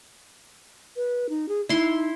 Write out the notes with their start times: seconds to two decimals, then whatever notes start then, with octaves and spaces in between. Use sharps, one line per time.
0.96 B4
1.30 D#4
1.49 G#4
1.69 D#4 E4 C6